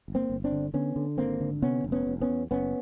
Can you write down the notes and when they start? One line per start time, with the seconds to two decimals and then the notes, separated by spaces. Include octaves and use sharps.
0.08 G1
0.15 A#3 C4
0.30 G1
0.44 C4 D4
0.52 D3
0.74 D3 B3 C#4
0.96 D3
1.18 G#1 A#3 C4
1.40 D3
1.62 C3 B3 C#4
1.84 F1
1.92 B3 C#4
2.07 F1
2.21 B3 C#4
2.29 E2
2.51 F#1 B3 C#4